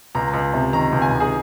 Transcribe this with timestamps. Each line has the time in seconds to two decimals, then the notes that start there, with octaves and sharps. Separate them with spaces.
0.15 C#2 A#5
0.33 C#2
0.54 C3
0.73 D#3 A#5
0.93 C#2
1.02 G#5
1.12 C#2
1.20 G#4